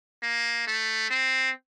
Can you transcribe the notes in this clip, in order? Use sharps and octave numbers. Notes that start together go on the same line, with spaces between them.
A#3
A3
C4